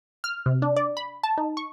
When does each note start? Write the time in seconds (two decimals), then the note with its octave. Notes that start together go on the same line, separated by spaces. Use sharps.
0.24 F6
0.46 C3
0.62 D4
0.77 D5
0.97 B5
1.23 A5
1.37 D#4
1.57 C#6